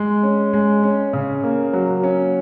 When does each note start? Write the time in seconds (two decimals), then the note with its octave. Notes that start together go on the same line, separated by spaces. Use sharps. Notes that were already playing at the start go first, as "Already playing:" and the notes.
Already playing: G#3
0.23 C#4
0.53 G#3
0.83 C#4
1.13 C#3
1.44 A#3
1.73 F#3
2.03 C#4